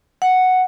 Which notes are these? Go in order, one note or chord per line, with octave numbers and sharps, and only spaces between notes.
F#5